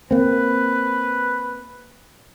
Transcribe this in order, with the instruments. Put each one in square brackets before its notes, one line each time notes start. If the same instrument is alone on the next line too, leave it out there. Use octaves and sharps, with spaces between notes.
[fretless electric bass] A#3 C4 [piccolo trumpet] B4